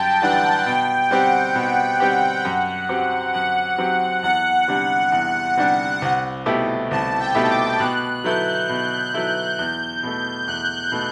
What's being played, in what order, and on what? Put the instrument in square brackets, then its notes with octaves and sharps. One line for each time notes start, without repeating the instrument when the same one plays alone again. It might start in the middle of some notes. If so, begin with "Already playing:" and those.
Already playing: [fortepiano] F#2 G3 [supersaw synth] G5 A5
[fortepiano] E3 G3 D4 [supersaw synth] F#5
[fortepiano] B2 [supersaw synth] G5
[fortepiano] G3 C4 G4 [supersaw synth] F#5
[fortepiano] B2
G3 C4 G4
F#2
F#3 C4 G4
[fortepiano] F#2 [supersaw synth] F#5
[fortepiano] F#3 C4 G4
[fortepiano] E2 [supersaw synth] F#5
[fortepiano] C3 G3 D4
E2
C3 G3 D4
C2
B2 A3 E4 G4
[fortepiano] C2 [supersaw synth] A5
[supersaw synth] G5
[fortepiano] B2 A3 E4 G4
[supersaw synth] D6
[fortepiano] B2 [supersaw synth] F#6
[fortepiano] F#3 B3 E4 A4 [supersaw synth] G6
[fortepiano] B2
F#3 B3 E4 A4
[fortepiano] E2 [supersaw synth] G6
[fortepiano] B2 A3
[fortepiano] E2 [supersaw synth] F#6
[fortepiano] B2 A3